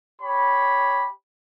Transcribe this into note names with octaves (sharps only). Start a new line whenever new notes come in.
G4 C#5 B5